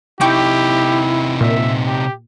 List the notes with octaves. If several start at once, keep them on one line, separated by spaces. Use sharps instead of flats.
C3 D#4 E4 G4 G5 C#6 D6
A#2 E5
G4